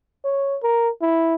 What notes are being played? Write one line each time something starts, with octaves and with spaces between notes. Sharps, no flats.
C#5
A#4
E4